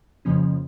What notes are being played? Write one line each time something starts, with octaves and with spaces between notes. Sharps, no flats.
F2 C#3 F3 A#3 C#4